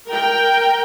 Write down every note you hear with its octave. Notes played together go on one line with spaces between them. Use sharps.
A#4 G5